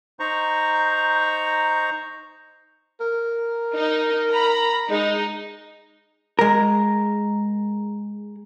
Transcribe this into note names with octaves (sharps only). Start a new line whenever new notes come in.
D#4 C5 A#5 C#6
A#4
D#4 D#5
A#5 B5
G#3 D#4
G#3 A#4